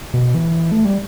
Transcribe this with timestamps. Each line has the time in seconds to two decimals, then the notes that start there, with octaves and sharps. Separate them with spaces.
0.14 B2
0.34 E3
0.72 A3
0.85 G3